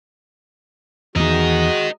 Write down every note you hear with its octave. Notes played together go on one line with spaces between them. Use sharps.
E2 D#3 G#3 F#4 A#4 D#5